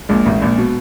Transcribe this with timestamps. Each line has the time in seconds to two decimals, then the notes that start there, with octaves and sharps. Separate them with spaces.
0.09 A#1 A#2 G#3
0.25 A1 A2
0.41 A#1 A#2
0.58 B2